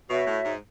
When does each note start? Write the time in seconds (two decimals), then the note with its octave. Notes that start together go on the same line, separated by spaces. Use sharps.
0.09 B2 F#4 C#5 E5
0.27 A2
0.45 G#2